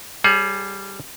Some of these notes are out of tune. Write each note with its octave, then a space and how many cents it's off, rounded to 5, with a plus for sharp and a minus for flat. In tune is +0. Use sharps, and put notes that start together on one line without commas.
G3 +0 G#4 +30 C#5 +0